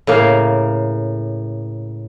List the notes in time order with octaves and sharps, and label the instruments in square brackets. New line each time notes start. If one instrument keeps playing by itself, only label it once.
[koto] A2 C#3 A#3 F5